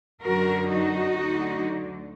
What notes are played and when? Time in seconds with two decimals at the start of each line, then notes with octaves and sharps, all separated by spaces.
0.24 F#2 D3 F#3 F#4 A#4
0.69 D#4 F#4
1.16 D2 D3 F#3